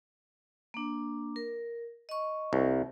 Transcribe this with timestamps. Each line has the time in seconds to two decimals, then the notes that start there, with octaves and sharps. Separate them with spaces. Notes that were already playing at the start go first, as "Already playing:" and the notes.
0.74 A#3 D4
1.36 A#4
2.09 D#5 C#6
2.53 C2